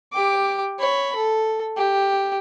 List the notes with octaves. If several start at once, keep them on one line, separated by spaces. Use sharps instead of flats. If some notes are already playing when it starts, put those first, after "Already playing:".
G4 D6
C#5 B5
A4
G4